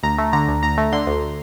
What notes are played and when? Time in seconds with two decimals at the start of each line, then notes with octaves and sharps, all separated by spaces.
0.03 D2 A#5
0.18 A3
0.33 D3 A#5
0.48 D2
0.63 D2 A#5
0.78 A3
0.92 D3 C6
1.07 D2